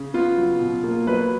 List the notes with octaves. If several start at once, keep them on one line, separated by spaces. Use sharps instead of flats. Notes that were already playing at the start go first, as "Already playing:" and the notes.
Already playing: C#3
B3 F4
F#3
B2
A#3
F#3 B4